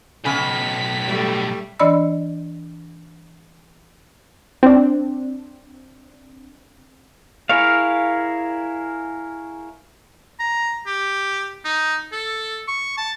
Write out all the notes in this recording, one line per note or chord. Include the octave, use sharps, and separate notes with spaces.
B1 A2 C#3 G#5 B6
G3 A3
E3 D4 D5 D#5 B5 E6
C4 D4
E4 G#4 A#4 C#5 F5
A#5
G4
D#4
A4
C#6
A5